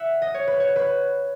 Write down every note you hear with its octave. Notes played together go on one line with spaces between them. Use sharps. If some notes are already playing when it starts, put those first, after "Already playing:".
Already playing: E5 F#5
D#5
C#5
B4
C#5
B4